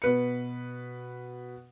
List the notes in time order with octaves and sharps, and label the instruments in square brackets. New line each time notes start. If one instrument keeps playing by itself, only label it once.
[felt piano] B2 B4 C#7